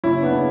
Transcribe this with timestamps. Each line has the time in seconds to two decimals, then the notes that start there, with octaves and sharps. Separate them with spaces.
0.03 F#1 C#4 E4
0.23 B3 D4
0.31 C#3